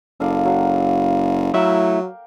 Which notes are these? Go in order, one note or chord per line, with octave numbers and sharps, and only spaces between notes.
F#1 A4 D5 F5
F#3 F#4 F5
F#3 A3 E4 A#4 E5 G5